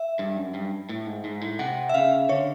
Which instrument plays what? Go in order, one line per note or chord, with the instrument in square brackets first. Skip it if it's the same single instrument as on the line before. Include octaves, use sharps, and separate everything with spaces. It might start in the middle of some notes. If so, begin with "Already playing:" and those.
Already playing: [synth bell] E5
[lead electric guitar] G2
F#2
G2
A2
G#2
G#2
A2
[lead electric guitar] C3 [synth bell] F#5
[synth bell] E5
[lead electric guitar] C#3 [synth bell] F5
[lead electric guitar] D3 [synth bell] C#5